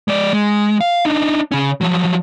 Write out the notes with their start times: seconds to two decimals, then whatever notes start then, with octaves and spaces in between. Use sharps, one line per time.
0.08 G#3 D5
0.33 G#3
0.81 F5
1.05 D4 D#4
1.52 C#3 C#4
1.81 F3 F#3